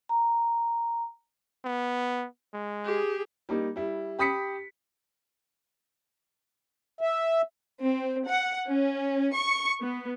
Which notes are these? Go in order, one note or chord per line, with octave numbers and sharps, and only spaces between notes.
A#5
B3
G#3
G4 G#4
G3 A#3 D#4
G3 E4
G4 B5 D#6 B6 C#7
E5
C4
F#5
C#4
C#6
B3